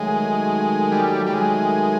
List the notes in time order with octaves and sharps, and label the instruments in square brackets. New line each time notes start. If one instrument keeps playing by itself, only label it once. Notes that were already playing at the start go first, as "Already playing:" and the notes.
Already playing: [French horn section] D#3 F#3 A3 [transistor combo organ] G#3
[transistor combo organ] G3
G3
G#3